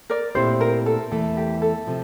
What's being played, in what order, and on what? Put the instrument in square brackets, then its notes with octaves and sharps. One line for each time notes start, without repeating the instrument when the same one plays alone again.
[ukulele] A#4 D5
[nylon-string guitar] A#2 A3 C4 E4 G4 [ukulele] C5
[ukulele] A#4
A4
[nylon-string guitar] E2 E3 A3 [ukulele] A4
[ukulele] G4
A4
[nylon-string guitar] C3 F3